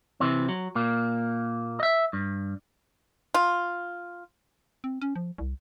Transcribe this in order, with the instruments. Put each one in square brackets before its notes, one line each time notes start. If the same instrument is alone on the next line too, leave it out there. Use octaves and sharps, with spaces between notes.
[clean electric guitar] C3 E3 C4
F#3
A#2 A#3
D#5 E5
G2
[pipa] F4
[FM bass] C4
C#4
F3
C2